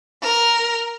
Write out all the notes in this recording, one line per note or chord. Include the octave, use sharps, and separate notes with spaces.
A#4